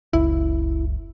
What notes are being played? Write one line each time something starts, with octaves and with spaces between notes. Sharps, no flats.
F#1 C#2 E4